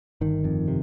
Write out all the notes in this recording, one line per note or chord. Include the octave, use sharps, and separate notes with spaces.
G1 D#3
F2
C3